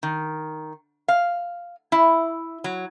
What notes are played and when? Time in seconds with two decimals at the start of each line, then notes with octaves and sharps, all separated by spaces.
0.03 D#3
1.08 F5
1.92 E4
2.64 F#3